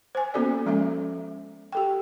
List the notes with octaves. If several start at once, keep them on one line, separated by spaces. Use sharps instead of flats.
C5 G#5
A#3 B3 C#4 F#4 A4 D5
F3 G#3 C#4 A4 E5
G4 A4 G5